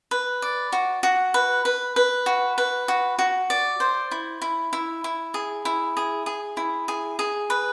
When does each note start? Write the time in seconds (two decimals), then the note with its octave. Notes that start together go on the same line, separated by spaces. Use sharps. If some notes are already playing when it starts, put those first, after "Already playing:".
0.11 B4
0.42 D5
0.72 F#4
1.03 F#4
1.34 B4
1.65 B4
1.96 B4
2.26 F#4
2.58 B4
2.88 F#4
3.19 F#4
3.50 D5
3.80 C5
4.11 E4
4.42 E4
4.73 E4
5.04 E4
5.34 G#4
5.65 E4
5.97 G#4
6.26 G#4
6.57 E4
6.88 G#4
7.19 G#4
7.50 B4